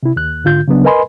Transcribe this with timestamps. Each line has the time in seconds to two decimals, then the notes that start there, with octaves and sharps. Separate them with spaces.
0.03 C3 E4
0.16 D#2 F#6
0.44 G#2 D3 F4 G6
0.68 C#3 F#3 B3 D4
0.85 A#4 B4 D#5 G#5 B5 C6